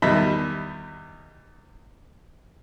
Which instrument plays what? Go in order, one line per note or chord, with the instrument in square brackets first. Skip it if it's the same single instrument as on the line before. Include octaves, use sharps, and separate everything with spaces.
[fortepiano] E2 D#3 G3 D#5 E5 B5